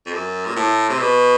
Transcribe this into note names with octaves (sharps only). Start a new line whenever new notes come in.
F2
F#2
A#2
A2
C3
B2